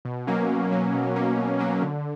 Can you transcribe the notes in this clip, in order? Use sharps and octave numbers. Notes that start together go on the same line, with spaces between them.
B2
F#3 A#3 C#4
B2
F#3 A#3 C#4
B2
F#3 A#3 C#4
B2
F#3 A#3 C#4
D3